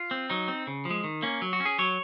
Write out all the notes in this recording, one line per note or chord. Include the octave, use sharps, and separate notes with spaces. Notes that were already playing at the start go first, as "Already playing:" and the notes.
Already playing: F4
C4
F#3 D#4
C4
C#3
F3
G#3
D#3
A#3 C#4
F#3
F#4
C#4
G#4
F#3 C#5